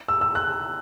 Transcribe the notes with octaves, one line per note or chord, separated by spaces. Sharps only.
E6
E6
F#6